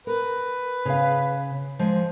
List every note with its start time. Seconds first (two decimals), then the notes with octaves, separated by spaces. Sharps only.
0.07 A#4 B4
0.85 C#3 F5
1.79 F3 G#3